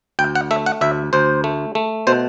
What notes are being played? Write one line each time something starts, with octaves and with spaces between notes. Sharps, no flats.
D2 G5
F#5
A3 E5
F#5
D2 E5
D2 C5
A3
A3
B2 C5